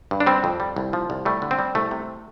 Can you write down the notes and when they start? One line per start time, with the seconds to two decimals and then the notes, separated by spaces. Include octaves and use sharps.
0.11 G2
0.20 D4
0.26 G3 C4
0.44 F2
0.60 G3
0.76 C2
0.93 F3
1.10 C2
1.25 G3 A3
1.42 D3
1.51 C4
1.59 G3
1.75 C2 A3
1.91 C3